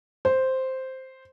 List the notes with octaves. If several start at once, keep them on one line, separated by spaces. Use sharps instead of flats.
C5